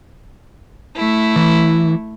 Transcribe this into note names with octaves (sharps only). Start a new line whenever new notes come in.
A3 E4
E3